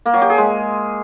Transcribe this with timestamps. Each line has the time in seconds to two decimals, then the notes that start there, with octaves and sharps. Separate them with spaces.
0.06 A#3
0.14 F#3
0.22 G4
0.30 G#4
0.38 G#3